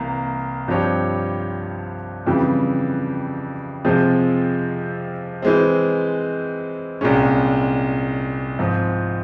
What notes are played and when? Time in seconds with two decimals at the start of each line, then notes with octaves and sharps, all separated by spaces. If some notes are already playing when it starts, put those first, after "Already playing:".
Already playing: C2 E3 A#3
0.68 G2 F3 C4 G4 C#5
2.26 F2 C#3 E3 G3
3.85 F2 C3 F3 G#3 C4
5.42 E3 G#3 C4
7.01 C2 A#2 G#3 C#4
8.59 G#2 F3 C4